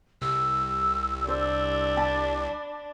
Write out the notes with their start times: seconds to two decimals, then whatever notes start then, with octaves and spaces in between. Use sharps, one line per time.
0.22 C2 E6
1.28 D4 C5
1.97 A5 B5